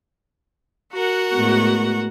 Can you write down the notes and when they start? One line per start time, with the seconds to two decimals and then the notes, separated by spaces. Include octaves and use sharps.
0.92 F#4 A#4 F#5
1.33 A2 G#3 B3